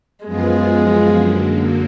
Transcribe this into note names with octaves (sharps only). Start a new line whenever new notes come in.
F#2 F3 G#3 B3 F4 G#4
F#2 D3 F#3 A#3